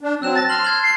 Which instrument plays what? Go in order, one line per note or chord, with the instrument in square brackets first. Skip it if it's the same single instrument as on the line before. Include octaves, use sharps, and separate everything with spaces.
[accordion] D4
[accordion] F#3 C4 [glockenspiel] E6 F#6 E7
[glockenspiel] A5 A#6 [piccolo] A6
[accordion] C6 [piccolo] F6 [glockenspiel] A6 F#7
[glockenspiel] G#6 F#7
[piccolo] C7